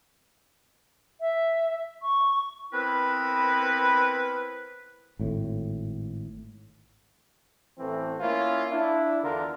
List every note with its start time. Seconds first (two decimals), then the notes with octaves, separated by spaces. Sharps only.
1.21 E5
2.02 C#6
2.73 B3 C4 E4 A#4 B4
5.19 G#1 A2
7.79 A1 E3 A3 C4
8.21 A#3 C#4 E4 F4
8.72 D4 E4
9.24 E2 D3 F4 A#4